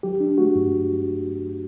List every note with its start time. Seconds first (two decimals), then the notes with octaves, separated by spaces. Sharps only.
0.03 F#3 G4
0.20 D4
0.38 A3 F#4
0.56 G2